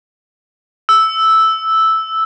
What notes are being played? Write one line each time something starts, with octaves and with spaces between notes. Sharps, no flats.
E6